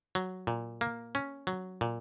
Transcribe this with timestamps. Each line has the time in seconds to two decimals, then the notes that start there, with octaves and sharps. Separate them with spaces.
0.15 F#3
0.47 A#2
0.81 A#3
1.15 C#4
1.47 F#3
1.81 A#2